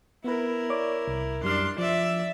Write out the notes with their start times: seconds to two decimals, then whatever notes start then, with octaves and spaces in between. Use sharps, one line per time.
0.24 B3 E4 A#4 B4
0.70 C#5 D5 D6
1.08 C2
1.43 F#2 G3 D4 C6 F6
1.78 F3 D5 E5